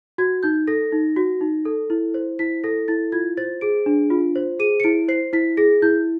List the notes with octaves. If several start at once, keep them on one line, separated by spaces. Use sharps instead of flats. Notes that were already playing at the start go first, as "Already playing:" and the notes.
F#4 G#6
D#4 G6
A4 A#6
D#4
F#4
D#4
A4
E4
C5
E4 B6
A4 A#6
E4 A6
F4 G#6
C5 A6
G#4 D7
D4
F4
C5
G#4 D#7
C#7
E4 D7
C5 C7
E4 B6
G#4 A#6
E4 G6